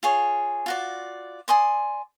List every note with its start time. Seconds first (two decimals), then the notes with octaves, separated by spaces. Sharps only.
0.03 F4 G#4 C#5
0.66 F4 F#4 D5
1.48 D5 G#5 C6 D#6